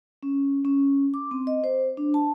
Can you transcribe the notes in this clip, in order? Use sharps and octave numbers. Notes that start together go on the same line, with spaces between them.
C#4
C#4
D6
C4
D#5
C5
D4
A5